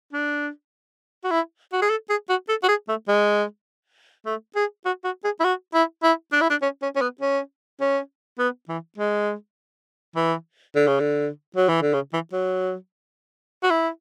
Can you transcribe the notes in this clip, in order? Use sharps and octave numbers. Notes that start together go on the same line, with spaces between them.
D4
F#4
E4
F#4
G#4
A4
G#4
F#4
A4
F#4
G#4
A3
G#3
A3
G#4
F#4
F#4
G#4
E4
F#4
E4
E4
D4
E4
D4
C#4
C#4
C#4
B3
C#4
C#4
B3
E3
G#3
E3
D3
C#3
D3
F#3
E3
D3
C#3
E3
F#3
F#4
E4